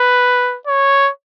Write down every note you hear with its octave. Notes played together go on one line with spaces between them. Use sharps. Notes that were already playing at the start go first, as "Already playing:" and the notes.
Already playing: B4
C#5